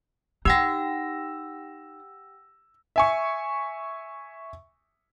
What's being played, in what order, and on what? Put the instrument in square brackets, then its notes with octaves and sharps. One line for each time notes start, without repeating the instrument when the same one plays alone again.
[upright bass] D#4 [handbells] G4 F#5 G5 [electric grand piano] E6 A#6
[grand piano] E5 G#5 C#6